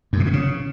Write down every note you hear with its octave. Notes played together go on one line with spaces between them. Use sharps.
F#2
C3
A#2
C#3